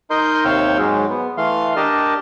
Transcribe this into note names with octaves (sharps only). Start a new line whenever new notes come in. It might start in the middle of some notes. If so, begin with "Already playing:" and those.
D#4 A#4 D#5 C6 G6
D#2 C3 C#5 F5 G5 E6
G#2 F#3 G#3
B3
E3 A3 F5 C6
D4 G4 A#4 D#5 A5